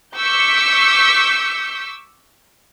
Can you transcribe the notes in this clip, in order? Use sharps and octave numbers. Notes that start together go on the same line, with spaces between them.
C#6 D6 E6 G6 B6 C#7